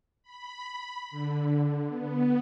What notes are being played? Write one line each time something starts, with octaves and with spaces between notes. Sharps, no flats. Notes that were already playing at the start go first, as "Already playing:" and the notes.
B5
D3
B3